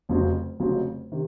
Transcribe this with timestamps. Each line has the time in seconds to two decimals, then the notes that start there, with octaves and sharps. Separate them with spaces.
0.09 F1 F2 C#3 F#3 C4
0.60 F1 F2 C#3 F#3 C4
1.12 C3 D#3